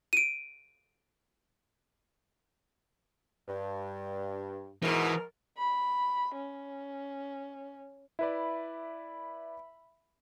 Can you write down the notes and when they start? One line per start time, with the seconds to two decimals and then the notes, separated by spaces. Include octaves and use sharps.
0.13 D7 D#7
3.48 G2
4.83 G#2 B2 E3 A#4
5.58 B5
6.35 C#4
8.19 E4 B4 D5 E5 B5